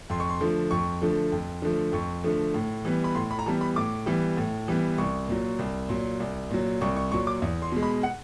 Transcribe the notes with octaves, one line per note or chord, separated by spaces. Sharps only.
F2 C6
C#6
C6
D3 F3 A3
F2 C#6
D3 F3 A3
F2
D3 F3 A3
F2 C#6
D3 F3 A3
A2
E3 G3 B3
B5
A2 C6
B5
A#5
E3 G3 B3 A5
B5
A2 D6
E3 G3 B3
A2
E3 G3 B3
C2 C#6
A#2 F#3
C2
A#2 F#3
C2
A#2 F#3
C2 C#6
C#6
A#2 F#3 C#6
D6
E2
C6
B2 G#3
B5
F#5